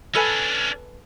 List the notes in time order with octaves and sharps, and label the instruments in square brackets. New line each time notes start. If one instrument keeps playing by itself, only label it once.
[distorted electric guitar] C#4 D4 [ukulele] A4 B4 G#5